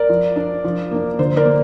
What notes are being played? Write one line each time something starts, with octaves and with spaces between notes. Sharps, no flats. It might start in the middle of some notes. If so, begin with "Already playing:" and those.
Already playing: A#4 D5
F3
D4
F3
A#3 D4
D3 C5
A#4 D5
A#3